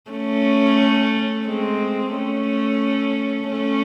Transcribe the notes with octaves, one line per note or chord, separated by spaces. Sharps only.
A3 C#4
G#3 C4
A3 C#4
A3 C#4